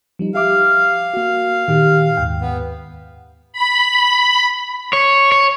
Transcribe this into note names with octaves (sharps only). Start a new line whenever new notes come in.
F3 G3 D#4
G4 E5 F5 D6
A#3 F#4
A#2 D#3 G4
D#2 G#2 G5
B3
B5
C#5
C#5